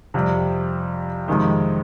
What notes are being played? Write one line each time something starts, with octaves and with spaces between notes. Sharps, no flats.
F2 C3 G3
F2 C3 D#3 G#3